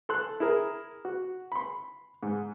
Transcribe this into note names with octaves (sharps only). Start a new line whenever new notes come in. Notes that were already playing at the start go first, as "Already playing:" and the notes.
A4 C6 F#6
E4 G#4 A#4
F#4
B5 C6
G#2